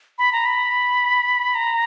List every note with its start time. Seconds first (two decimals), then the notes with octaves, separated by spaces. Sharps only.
0.18 B5
0.33 A#5
0.46 B5
1.55 A#5